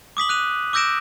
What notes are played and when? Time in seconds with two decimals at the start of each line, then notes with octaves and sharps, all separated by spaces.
0.17 D6 D#6 B6 F#7
0.29 F#6 D#7 F7
0.73 D6 E6 G6 A#6 D7 E7